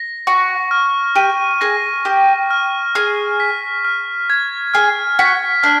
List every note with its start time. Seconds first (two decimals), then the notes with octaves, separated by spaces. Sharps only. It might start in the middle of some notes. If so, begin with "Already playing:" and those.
Already playing: A#6
0.27 F#4 C#6
0.71 F6
1.16 G4 D#7
1.61 G#4 A#6
2.05 G4 C#6
2.51 F6
2.95 G#4 F6
3.40 B6
3.85 F6
4.30 G#6
4.74 G#4 F6
5.19 F#4 B6
5.63 D4 F6